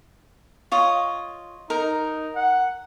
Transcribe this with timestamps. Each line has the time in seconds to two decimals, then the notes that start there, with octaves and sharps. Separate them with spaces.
0.72 F4 C#5 D#5
1.70 D#4 A#4
2.36 F#5